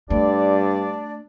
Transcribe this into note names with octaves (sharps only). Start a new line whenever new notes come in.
G2 A3 D4 D5